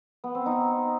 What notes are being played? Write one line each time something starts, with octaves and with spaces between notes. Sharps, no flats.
B3
C4
D#4